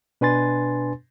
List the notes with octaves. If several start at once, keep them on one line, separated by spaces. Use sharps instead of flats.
B2 D4 B4 G#5 C6 A6